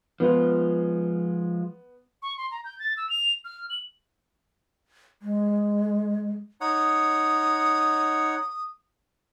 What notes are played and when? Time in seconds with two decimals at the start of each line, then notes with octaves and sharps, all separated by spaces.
0.20 F3 G#3 B3 F4
2.22 C#6
2.38 C6
2.51 A#5
2.65 G6
2.79 A6
2.97 E6
3.10 F7
3.45 F6
3.70 F#7
5.22 G#3
6.61 D#4 C#5 F#5 D#6